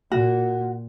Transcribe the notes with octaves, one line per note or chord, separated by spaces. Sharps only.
A#2 F#4